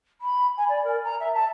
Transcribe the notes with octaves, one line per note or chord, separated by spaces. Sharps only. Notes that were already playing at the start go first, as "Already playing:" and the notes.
B5
G#5
D5
A#4
A#5
E5
A5